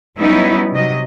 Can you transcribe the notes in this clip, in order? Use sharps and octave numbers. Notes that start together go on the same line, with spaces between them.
F#3 G3 B3 C#4 D#4 E4
C3 F#3 D#5